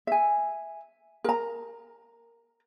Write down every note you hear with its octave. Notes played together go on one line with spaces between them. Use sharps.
E5 G#5
A#4 A#5